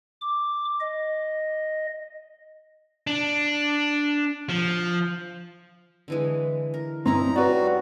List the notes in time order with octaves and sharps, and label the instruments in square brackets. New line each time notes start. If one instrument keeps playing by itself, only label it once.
[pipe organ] D6
D#5
[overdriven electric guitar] D4
F3
[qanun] D3 E3 G#3
A#4
[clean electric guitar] G2 C4 [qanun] C#4 D#4 E4 [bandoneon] A#5
[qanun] F#3 G3 [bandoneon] F#4 [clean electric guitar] B4 D5